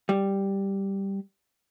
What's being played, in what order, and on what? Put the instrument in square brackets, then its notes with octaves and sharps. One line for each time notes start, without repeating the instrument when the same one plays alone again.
[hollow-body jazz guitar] G3